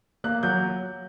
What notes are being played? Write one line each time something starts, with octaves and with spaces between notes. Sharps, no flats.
A#3 F#6
F#3 G6